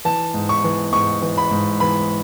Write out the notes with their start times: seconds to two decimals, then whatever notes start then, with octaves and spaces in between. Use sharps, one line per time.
0.05 E3 A5
0.34 G#2
0.49 C#6
0.64 E3
0.93 G#2 C#6
1.22 E3
1.38 B5
1.51 G#2
1.80 E3 B5